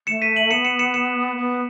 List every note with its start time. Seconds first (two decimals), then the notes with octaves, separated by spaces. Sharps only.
0.07 A3 C#7 E7
0.22 B6 D#7
0.36 D#7 F#7
0.51 B3 C#7 E7
0.65 C#7 E7
0.79 C#7 E7
0.94 C#7 E7
1.37 B3